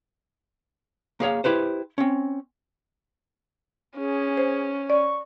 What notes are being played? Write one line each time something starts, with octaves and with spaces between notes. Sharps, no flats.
A#3 G#4 C#5 F5
E4 G4 B4 C5
C4 C#4
C#4 G#4
C5
D5 C#6